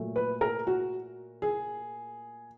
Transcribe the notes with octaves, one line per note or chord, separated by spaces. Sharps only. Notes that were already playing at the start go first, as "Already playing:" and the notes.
Already playing: A#2 F#3 A3
B4
A#4
F#4
G#4